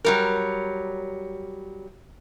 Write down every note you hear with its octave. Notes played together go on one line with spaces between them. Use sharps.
F#3 G3 A#4